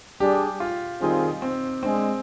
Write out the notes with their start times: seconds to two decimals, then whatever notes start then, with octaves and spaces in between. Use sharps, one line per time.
0.20 G3 D4 G4 G#4
0.60 F4
1.01 D#3 G3 C4 D#4 F4 G#4
1.42 C4
1.83 G#3 C4 D4 G#4